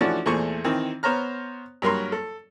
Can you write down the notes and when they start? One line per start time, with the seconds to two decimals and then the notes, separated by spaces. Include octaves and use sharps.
0.01 E3 F3 A3 C#4 D4 F#4
0.26 E2 A#2 A3 G#4 C5 C#6
0.64 D#3 E3 C4
1.03 B3 C5 C#5 A#5 F6
1.82 G2 F#3 A#3 A#4 C#5 C6
2.12 A4